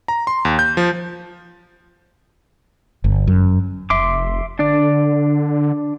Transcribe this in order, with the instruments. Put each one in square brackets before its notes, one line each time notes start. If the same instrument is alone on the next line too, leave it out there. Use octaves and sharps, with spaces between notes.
[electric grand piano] A#5
C6
D#2
G6
F3
[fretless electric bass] G1
F#2
[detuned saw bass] F1 [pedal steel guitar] E5 C6 D6
[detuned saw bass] D3 [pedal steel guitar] D4 D5